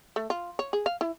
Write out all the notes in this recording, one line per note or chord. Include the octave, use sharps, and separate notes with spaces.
A3
F4
C#5
G#4
F5
E4